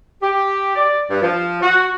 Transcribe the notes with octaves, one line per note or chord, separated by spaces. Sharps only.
G4
D5
G2
F3
F#4